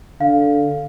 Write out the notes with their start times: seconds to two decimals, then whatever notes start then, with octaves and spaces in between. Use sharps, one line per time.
0.21 D3 F5